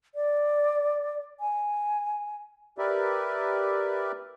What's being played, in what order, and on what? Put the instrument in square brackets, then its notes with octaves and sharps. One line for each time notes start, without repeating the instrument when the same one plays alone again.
[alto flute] D5
G#5
[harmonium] G4 A#4 B4 D5 E5